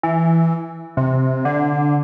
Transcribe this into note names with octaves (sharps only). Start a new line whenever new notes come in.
E3
C3
D3